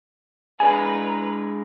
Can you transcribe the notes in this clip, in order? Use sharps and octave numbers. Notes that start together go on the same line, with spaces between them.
G#3 D4 G#4 B4 G#5 A#5